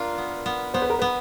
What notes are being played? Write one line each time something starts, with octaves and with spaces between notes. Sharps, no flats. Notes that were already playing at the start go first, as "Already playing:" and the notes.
Already playing: D4 F4 A#4
B3
B3
B3 C5
B4
A#4
B3 B4